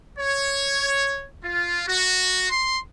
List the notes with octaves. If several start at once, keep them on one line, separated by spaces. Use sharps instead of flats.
C#5
F4
F#4
C6